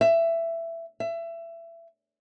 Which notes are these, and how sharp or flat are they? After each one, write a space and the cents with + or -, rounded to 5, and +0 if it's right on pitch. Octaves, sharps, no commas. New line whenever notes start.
E5 +15
E5 +25